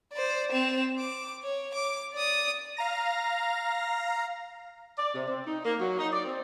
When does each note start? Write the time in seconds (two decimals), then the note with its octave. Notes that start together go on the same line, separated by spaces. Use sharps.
0.13 C5 D5
0.52 C4 E7
0.99 D6
1.43 C#5
1.74 D6
2.14 D5 D#6
2.77 F5 A#5 A#6
4.98 D5
5.14 C3
5.28 C4
5.47 D#4
5.65 A#3
5.80 F#3
5.98 D#4
6.12 D5
6.25 C4